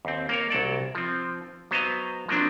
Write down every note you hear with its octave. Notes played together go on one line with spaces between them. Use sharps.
D#2 C4
A#3 A#4 C#5
C2 F#3 A4 D5
F3 C4
F#3 B3 C5 D#5 F5
F3 F#3 A#3 C4 D4